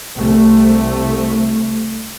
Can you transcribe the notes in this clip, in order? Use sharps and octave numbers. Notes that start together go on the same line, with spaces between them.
C2 A3